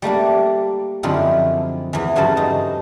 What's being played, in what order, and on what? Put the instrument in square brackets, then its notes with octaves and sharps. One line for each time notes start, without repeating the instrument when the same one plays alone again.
[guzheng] G3 A3 A#3 D4
F#2 D3 F3 C4 D#4 E4
E2 E3
G2 C#3 F#3 A3 C5 A5
D#4